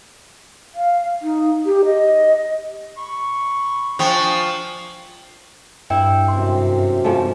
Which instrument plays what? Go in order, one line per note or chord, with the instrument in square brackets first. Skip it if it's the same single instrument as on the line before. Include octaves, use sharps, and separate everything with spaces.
[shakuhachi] F5
D#4
G4
D#5
[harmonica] B5 C#6
[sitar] F3 [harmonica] D4 G#5 [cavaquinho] G5 C#6
[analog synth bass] G2 [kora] E4 [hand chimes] G5
[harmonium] F#2 C3 [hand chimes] C6
[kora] G#2 F3 A3